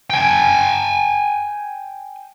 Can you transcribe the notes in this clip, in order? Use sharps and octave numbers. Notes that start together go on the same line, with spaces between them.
G5 G#5